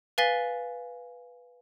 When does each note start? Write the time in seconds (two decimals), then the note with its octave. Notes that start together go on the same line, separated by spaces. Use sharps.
0.18 B4 F5 G#5 A6 B6 G7